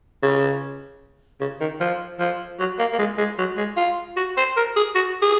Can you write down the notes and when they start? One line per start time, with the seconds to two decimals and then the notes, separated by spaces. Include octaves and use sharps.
0.23 C#3
1.41 C#3
1.60 D#3
1.81 F3
2.19 F3
2.60 F#3
2.79 A#3
2.93 A#3
2.99 G#3
3.18 G#3
3.38 F#3
3.58 G#3
3.77 F4
4.17 F#4
4.37 C5
4.57 A#4
4.76 G#4
4.95 F#4
5.22 G#4